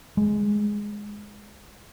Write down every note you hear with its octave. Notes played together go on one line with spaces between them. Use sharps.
G#3